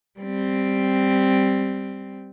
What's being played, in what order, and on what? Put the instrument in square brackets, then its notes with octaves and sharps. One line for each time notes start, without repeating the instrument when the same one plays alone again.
[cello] G3 C4